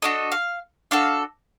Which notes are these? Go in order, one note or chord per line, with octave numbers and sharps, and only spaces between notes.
D4 F#4 A4 D#5
F5
D4 F#4 A4 F5